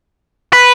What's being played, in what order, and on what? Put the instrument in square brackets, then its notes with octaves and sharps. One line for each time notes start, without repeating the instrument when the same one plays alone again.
[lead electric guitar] B4